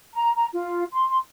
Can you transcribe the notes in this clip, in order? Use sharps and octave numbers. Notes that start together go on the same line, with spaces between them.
A#5
A#5
F4
C6